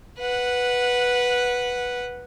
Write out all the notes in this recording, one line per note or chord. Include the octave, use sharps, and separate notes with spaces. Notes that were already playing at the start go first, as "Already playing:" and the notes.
B4 F#5